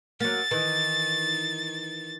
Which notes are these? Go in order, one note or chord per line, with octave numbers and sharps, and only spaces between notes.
F#3 A#3 A6
D#3 E3